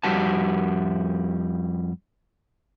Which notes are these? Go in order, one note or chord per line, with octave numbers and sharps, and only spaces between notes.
F2 G3 F#4 A5